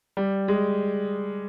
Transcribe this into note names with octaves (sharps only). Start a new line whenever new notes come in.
G3
G#3